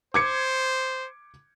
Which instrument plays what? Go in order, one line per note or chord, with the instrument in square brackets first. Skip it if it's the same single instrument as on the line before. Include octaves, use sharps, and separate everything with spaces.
[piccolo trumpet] C5 [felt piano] D6 G#6 C#7